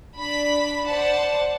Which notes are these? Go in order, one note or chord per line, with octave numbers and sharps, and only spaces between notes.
D4 B5 B6
C5 D5 F#5 A5